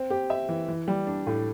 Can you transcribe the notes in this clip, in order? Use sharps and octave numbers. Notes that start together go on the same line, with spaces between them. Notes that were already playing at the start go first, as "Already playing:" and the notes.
Already playing: C4
G4
E5
E3
E3
G3
D4
A2